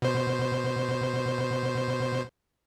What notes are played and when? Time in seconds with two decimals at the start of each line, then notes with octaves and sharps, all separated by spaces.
0.02 B2 C5